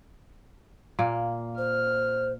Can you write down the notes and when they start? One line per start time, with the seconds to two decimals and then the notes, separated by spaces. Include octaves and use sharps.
0.99 A#2 A#3
1.58 C5 F6